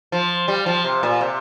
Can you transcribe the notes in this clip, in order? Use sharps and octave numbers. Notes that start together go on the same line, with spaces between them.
F3
G3
F3
C3
A#2
C3